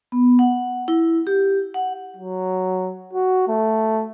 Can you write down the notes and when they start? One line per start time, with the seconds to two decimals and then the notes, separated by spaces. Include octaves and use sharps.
0.12 B3
0.39 F#5
0.88 E4
1.27 G4
1.74 F#5
2.17 F#3
3.13 F#4
3.48 A3